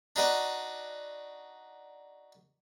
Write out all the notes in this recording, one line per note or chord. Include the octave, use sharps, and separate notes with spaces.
D4 D#4 F#4 B4 D6